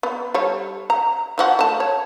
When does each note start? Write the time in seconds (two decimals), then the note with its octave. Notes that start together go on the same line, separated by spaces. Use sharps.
0.03 B3
0.34 G3 A4 C#5
0.90 A#5
1.38 E3 F3 F#4
1.59 A3 A5
1.80 C#5